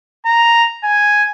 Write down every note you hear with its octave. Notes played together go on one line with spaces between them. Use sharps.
A#5
G#5